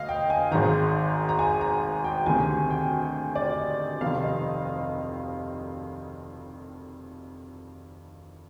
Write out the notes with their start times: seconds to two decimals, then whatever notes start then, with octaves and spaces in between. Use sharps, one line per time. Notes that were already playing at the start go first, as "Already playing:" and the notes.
Already playing: D2 D#5 F5
0.09 G5
0.30 G#5
0.51 G#1 G#2 D#3 A#5
1.29 A#5
1.39 G#5
1.61 A#5
2.04 G5
2.26 D2 C3 D#3 G#5
2.70 G5
3.35 D5
3.58 D#5
4.01 F1 F2 C3 D#3 F5
4.23 D#5